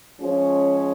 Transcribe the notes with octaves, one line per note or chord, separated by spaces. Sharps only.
F3 G#3 C#4